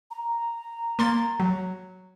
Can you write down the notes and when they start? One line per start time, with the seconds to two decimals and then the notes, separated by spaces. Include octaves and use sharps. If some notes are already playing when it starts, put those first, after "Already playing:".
0.11 A#5
0.99 A#3 C6 A6
1.40 F#3